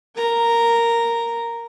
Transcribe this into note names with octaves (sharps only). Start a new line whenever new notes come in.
A#4 A#5